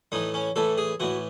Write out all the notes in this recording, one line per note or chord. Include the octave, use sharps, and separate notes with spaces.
A2 E3 D#4
C#4
A2 E3 A4
G#4
A2 E3 F#4